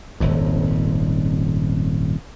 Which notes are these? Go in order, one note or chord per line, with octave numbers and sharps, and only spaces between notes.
D#1 G#1 F2